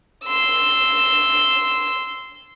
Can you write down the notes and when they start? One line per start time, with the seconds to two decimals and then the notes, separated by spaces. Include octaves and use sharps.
0.24 C6 E6